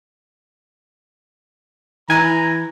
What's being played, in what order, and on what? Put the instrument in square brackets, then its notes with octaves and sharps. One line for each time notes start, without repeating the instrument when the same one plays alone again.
[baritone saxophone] E3 [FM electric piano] G#5 [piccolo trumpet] A#5